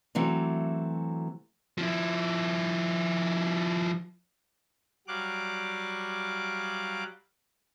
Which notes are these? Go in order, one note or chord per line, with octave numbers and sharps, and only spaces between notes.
E3 F#3 A3 C4
F3 E4
F#3 G3 F5 D6 F#6